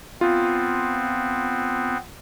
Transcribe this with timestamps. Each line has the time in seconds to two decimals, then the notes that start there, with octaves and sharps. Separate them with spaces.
0.21 B3 C4 F4